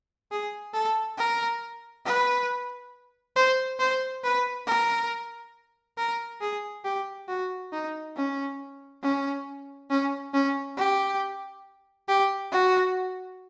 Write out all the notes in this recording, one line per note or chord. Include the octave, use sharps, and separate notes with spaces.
G#4
A4
A#4
B4
C5
C5
B4
A#4
A#4
G#4
G4
F#4
D#4
C#4
C#4
C#4
C#4
G4
G4
F#4